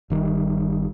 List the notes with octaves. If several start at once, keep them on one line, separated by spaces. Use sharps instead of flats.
G1 D#3 G3